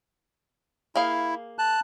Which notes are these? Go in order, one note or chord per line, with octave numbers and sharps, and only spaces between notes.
A#3 E4 G#4 F5
A5 F#6